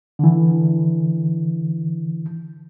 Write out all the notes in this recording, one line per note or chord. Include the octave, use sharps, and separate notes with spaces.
D3 E3